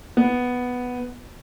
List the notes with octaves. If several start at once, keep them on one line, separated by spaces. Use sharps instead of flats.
B3